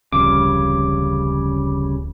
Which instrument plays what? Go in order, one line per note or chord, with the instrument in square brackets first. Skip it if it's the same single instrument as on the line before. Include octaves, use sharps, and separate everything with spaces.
[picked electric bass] D1 A#1 [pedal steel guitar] C#3 G3 C#4 [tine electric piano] D6